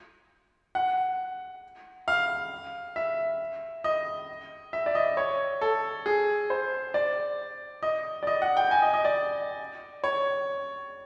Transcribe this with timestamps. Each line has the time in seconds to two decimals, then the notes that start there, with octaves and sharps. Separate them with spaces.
0.75 F#5
2.08 F5
2.96 E5
3.84 D#5
4.73 E5
4.86 D5
4.95 D#5
5.17 C#5
5.61 A4
6.06 G#4
6.50 C5
6.94 D5
7.83 D#5
8.23 D5
8.27 D#5
8.42 F#5
8.57 G5
8.71 G#5
8.82 D#5
8.94 D#5
9.05 D5
10.04 C#5